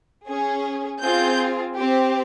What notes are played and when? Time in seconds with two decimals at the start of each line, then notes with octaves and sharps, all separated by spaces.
0.28 C#4 G#4
1.01 C4 F4 G#4 G6
1.75 C4 G4